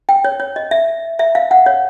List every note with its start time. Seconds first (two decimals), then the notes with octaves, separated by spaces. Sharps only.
0.09 G5
0.25 C#5
0.40 C#5
0.56 D#5
0.71 E5
1.19 E5
1.35 F5
1.51 F#5
1.66 C#5